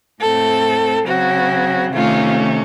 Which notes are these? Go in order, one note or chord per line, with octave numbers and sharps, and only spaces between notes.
A2 A3 C4 A4
C#3 F#3 C4 F#4
C3 D#3 A3 C#4 F4